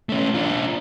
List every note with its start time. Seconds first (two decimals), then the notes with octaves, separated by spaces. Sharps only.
0.09 A3 C#4
0.34 D4 F4